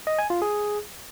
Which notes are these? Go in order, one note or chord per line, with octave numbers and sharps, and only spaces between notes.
D#5
G#5
F4
G#4